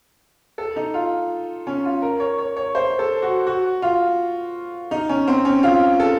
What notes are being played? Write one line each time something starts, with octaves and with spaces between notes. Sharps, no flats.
A4
D#4
F4
C#4
F4
A#4
C#5
C#5
C#5
C5
A4
F#4
F#4
F4
D#4
C#4
C4
C#4
F4
A4